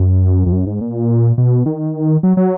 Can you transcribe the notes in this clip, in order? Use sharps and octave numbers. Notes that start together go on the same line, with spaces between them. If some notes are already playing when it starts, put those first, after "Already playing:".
Already playing: F#2
F2
F#2
G#2
A#2
B2
D#3
F#3
F#3